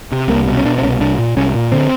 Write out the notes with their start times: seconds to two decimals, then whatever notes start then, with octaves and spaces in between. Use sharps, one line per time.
0.12 C3
0.28 C2 A#3
0.47 B2
0.57 C#4
0.64 B2 D4
0.78 C4
0.82 C2 C#4
1.00 C2 D4
1.18 A#2
1.36 C2 C#4
1.55 A#2
1.72 D3 C4